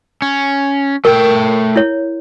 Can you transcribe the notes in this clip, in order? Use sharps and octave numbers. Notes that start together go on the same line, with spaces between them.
C#4
A3 A#4 G5
E4 C#5